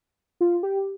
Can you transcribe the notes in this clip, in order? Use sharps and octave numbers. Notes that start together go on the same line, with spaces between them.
F4
G4